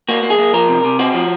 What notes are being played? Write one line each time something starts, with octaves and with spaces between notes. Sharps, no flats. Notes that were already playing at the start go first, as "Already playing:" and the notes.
A#3 F#4
A#3
G#4
A#3
F3 A#4
C3
C3
C4 F#4
F3